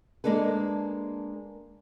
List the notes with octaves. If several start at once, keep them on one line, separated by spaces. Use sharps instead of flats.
G#3 A#3 D4 A4 B4